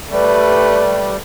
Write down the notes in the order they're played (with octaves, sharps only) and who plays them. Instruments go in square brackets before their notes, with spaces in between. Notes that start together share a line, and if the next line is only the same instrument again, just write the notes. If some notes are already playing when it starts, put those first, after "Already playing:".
[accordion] G3 [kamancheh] A3 B4